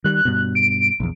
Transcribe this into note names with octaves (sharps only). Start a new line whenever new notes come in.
D#3 G3 F#6
G2 B2
D7
A#1 E2